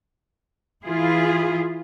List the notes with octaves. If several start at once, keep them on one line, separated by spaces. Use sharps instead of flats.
E3 E4 F4 G#4